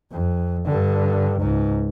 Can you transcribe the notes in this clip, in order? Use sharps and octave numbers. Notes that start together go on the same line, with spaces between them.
F2
G2 D3
C#2 G#2